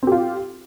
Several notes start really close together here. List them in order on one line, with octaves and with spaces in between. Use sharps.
C4 G4 F4